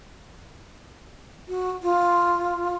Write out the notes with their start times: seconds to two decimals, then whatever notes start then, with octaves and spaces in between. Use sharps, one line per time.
1.48 F#4
1.83 F4